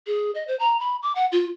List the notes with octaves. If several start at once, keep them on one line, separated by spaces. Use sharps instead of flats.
G#4
D#5
C5
A#5
B5
D6
F#5
F4